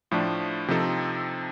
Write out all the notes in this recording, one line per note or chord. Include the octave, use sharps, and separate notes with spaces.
A2 F3 A3 D4
C3 F3 C4 D#4 A4